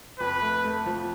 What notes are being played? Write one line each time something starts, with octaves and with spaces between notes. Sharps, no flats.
F2 B4
A3
A3
F3